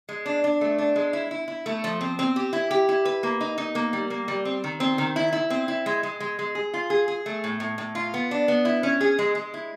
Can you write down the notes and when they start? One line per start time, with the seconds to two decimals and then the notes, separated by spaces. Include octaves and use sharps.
0.09 G#3
0.26 D4
0.44 D4
0.61 A3
0.78 D4
0.96 G#3
1.13 E4
1.31 E4
1.48 E4
1.66 A3
1.84 F3
2.01 C4
2.19 C4
2.36 G4
2.53 E4
2.71 G4
2.89 E4
3.05 B4
3.23 A#3
3.41 D#4
3.58 D#4
3.75 A#3
3.93 G3
4.10 A#3
4.28 G3
4.45 C4
4.64 D#3
4.80 C4
4.98 D#3
5.16 E4
5.33 E4
5.50 C4
5.68 E4
5.86 G#3
6.03 G#3
6.20 G#3
6.39 G#3
6.55 G#4
6.74 F4
6.90 G#4
7.08 G#4
7.26 A3
7.44 A2
7.60 A2
7.78 A2
7.95 F4
8.14 B3
8.31 D4
8.48 B3
8.65 E4
8.83 C#4
9.01 G#4
9.19 G#3
9.35 G#3
9.54 E4